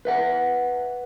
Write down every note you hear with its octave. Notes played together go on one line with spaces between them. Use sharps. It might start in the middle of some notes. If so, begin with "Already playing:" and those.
B4 E5 F#5